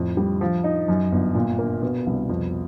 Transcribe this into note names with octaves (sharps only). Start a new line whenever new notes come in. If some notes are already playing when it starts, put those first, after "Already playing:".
Already playing: F2 A2
G3
F3
D#4
F#2
G1
A#2
A#3
B2
C2
F2